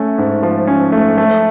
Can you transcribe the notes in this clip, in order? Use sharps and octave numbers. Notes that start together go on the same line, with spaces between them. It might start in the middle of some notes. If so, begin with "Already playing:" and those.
Already playing: A3 C#4
G#2
F3
C#4
A3
A3